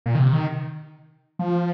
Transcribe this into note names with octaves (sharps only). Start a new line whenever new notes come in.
A#2
D#3
C3
D#3
F3